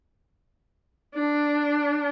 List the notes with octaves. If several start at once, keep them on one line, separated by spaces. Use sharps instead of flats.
D4